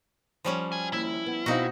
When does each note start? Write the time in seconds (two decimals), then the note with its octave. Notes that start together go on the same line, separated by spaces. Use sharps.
0.45 F3 G3 C#4
0.72 F#4 G#5
0.93 D#2 E4
1.26 B3
1.46 B2 C4 D#4 F#4 F5